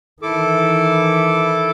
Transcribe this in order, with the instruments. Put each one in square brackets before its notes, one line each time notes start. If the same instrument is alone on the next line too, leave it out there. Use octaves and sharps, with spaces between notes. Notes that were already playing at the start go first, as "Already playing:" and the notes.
[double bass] D#3 E3 [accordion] E4 A4 D6